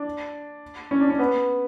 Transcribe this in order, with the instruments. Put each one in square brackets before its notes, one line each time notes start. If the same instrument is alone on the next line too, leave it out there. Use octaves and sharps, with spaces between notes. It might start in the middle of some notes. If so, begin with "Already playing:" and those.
Already playing: [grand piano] D4
C#4
D4
C#4
B3